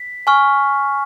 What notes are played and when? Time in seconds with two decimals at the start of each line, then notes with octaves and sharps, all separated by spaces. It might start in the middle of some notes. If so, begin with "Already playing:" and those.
Already playing: B6
0.27 G#5 C#6 F6